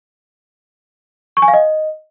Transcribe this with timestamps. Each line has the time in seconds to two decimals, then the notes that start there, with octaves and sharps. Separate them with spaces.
1.37 C#6
1.42 G#5
1.48 F5
1.54 D#5